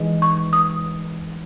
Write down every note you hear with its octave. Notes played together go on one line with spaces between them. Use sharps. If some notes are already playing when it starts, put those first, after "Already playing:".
Already playing: E3 G#3 D#4
C#6
D#6